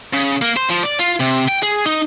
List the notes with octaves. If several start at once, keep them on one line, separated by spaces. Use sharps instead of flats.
C#3
A#3
C5
F3
D5
F4
C3
G5
G#4
D#4